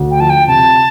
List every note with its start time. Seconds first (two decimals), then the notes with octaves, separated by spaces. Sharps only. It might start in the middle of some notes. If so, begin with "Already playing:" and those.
Already playing: D2
0.11 G5
0.20 F3 A5
0.29 G5
0.48 C3 A5